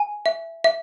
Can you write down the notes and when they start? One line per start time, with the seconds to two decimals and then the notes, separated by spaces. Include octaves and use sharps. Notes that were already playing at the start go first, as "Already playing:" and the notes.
Already playing: G#5
0.26 E5
0.64 E5